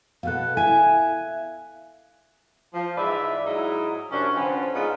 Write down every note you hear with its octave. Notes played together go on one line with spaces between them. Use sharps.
B2 B3 A4 F5 F#6
E4 E5 G#5
F3
G#2 E3 B4 D5 E5
G#2 F#3 D#4 E4
F#2 C3 C#4 D4
D3 F3 C4 C#4 B4
G#2 B3 D#4 F4